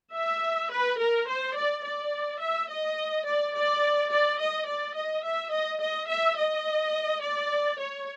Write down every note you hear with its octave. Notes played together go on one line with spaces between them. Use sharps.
E5
B4
A#4
C5
D5
D5
E5
D#5
D5
D5
D5
D#5
D5
D#5
E5
D#5
D#5
E5
D#5
D5
C#5